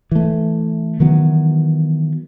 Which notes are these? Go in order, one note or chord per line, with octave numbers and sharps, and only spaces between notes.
E3 A3
D#3 E3 F#3 B3